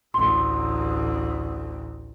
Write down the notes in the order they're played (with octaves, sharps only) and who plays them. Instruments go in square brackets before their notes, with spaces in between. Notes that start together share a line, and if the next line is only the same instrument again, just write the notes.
[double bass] A1 D2 [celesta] C6